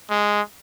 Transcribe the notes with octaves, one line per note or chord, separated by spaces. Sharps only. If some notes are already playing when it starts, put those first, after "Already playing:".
G#3